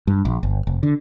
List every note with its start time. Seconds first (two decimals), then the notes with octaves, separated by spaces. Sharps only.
0.07 G2
0.25 A#1
0.43 G1
0.67 F1
0.83 D3